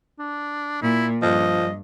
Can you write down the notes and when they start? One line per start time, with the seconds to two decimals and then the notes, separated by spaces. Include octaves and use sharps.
0.19 D4
0.82 A#2 E4
1.22 G2 F3 D#5